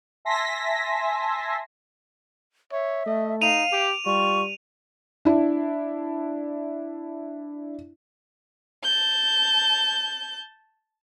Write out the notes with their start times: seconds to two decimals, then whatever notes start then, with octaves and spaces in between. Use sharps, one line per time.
0.25 E5 G#5 A5 C6 A#6 B6
2.72 C#5 E5
3.06 A3 D#5
3.41 D#4 F5 D#7 F7
3.72 G4 D6
4.06 G3 F4 C#6
5.25 D4 E4
8.83 A5 G6